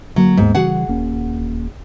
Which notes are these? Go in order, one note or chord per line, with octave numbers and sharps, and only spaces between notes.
D3 F#3 A#3
D#2 G#2 A#3 B3
C#3 E3 G3 F#4 G#4 F#5
D#1 A#3 C#4